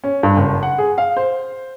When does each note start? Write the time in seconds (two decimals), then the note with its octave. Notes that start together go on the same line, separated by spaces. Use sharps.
0.04 C#4
0.23 G2
0.37 F#1
0.63 F#5
0.78 G#4
0.98 F5
1.17 C5